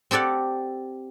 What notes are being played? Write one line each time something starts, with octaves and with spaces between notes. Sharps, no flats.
C4 G4 A4 D5 F#5